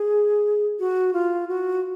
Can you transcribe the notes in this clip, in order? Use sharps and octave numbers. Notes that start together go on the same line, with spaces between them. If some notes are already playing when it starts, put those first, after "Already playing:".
Already playing: G#4
F#4
F4
F#4